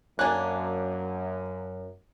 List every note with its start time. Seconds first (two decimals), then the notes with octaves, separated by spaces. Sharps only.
0.19 F#2 A#3 D4 G#5 F#6